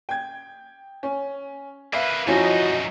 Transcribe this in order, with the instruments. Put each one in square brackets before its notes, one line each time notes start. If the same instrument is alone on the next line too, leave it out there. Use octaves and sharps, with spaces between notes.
[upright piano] G5 G#6
C#4
[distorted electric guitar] A#3 B4 [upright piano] E5 F5
[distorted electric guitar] F#2 D#4 [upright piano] F3 C#4 E4 [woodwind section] F#4 D#5